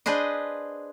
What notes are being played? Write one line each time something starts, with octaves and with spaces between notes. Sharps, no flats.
D4 G#4 B4 C5 D#5